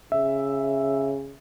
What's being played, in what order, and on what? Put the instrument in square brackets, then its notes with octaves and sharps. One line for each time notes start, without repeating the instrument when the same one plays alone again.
[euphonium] C#3 [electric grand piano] E5